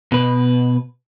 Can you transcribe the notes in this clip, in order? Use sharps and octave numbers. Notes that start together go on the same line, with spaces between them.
B2 B4